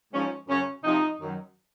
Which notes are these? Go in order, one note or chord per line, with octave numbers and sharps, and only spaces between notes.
G#2 F3 C#4
F#2 C#3 F#3 C#4
C3 F3 D#4
F#2 D#3 F#3